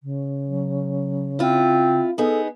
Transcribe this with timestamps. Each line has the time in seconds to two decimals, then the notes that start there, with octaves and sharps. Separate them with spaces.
0.03 C#3
0.47 F#3
1.39 C4 E4 F4
2.18 B3 D#4 G#4 A4